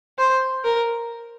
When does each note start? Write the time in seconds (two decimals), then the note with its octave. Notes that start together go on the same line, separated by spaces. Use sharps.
0.19 C5
0.64 A#4